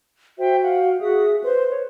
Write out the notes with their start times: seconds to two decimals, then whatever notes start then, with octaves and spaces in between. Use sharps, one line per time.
0.38 F#4 C5 E5 G5
0.63 F5 F#5
1.00 F#4 G#4 E5 D#6
1.44 B4 C5 C6
1.69 C#5